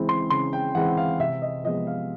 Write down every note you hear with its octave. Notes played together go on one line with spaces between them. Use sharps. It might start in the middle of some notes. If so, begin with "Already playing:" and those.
Already playing: C#3 E3 G#3 C4 E4
C6
C#3 C6
G5
E3 G#3 C4 E4 F#5
F5
C3 E5
D#5
F3 G#3 B3 D#5
F5